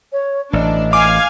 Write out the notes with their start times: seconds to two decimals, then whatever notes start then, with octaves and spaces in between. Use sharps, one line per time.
0.12 C#5
0.53 A1 D4 D#5
0.93 F5 G#5 D6